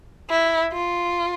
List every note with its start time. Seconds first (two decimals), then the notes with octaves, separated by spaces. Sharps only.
0.30 E4
0.73 F4